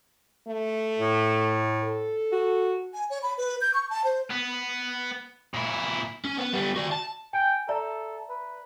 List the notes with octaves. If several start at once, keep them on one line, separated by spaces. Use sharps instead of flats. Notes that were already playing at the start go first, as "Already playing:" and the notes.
A3
A2
A4
F#4
G#5
C#5
B5
B4
G6
C#6
A5
C5
B3
A#2 E4
C#4
B3
G3 B3
F#4 D5
A5
G5 G#5
A4 D5 E5 A#5
B4